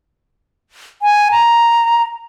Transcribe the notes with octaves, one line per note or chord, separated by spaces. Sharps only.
G#5
A#5